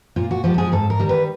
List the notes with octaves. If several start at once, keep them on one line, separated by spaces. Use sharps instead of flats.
A#2 F4
F#4
F3 G#3 G4
A4
G#4
G#2 A4
A#4
D#3 G3
B4